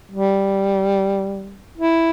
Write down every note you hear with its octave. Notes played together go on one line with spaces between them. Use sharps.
G3
E4